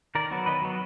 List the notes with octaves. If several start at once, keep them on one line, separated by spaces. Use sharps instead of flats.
D#3 A#4 D5
F#3 B3
D#3 B4 D#5
F#3 B3